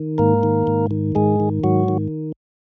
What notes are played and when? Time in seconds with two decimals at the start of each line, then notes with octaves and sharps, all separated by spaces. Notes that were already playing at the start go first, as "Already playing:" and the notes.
Already playing: D#3
0.18 G#2 A#3 A#4
0.43 D#3
0.67 G#2
0.91 D#3
1.15 G#2 G#3 G#4
1.40 D#3
1.64 G#2 F#3 F#4
1.88 D#3